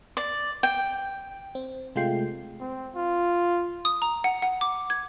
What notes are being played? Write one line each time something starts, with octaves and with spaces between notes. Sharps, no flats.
D5
G5
C4
C3 G#3 A3 F4 G5 C7
C4
F4
D#6
A#5
F#5
F#5
D6
G#6